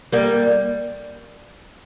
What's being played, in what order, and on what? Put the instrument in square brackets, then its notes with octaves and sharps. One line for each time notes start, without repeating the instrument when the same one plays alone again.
[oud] G3 A#3